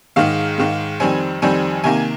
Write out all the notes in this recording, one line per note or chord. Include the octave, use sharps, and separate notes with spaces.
G#2 D#3 G#3 F5
G#2 D#3 G#3
F2 D#3 G3 C4 G#5
F2 D#3 G3 C4 G#5
C3 D#3 A#3 G#5